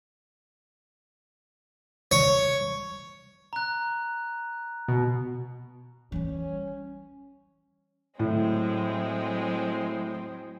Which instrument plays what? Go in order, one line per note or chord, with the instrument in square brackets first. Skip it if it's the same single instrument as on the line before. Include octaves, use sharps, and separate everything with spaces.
[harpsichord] C#5
[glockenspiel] A#5 F#6
[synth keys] B2
[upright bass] E3 G3 [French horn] C#4
[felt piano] A2 [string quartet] F#3 G#3 C4